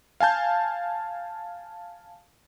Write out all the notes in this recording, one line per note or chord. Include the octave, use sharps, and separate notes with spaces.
F5 G#5 A5 G6